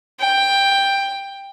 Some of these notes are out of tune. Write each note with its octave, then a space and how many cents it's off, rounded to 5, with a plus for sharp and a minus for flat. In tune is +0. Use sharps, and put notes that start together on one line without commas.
G5 +10